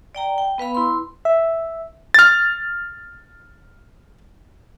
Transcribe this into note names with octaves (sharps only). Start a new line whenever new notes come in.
D5 G5 A#5
G5
B3 B4 F5 B5
E4 C6
E5
F6 A6